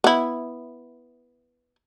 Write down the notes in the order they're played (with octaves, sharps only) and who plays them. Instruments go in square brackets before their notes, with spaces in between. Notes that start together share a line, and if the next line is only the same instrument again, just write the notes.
[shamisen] B3 E4